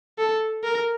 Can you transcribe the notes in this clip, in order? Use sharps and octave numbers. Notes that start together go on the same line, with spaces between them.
A4
A#4